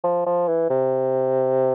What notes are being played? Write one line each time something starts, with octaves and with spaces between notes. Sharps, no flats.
F3
F3
E3
C3